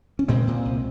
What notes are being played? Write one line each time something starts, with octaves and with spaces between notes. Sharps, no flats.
C#4
A#2 G#3 C4
A#2
C2